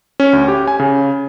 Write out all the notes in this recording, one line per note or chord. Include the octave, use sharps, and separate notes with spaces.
C#4
D2
G4
G#5
C#3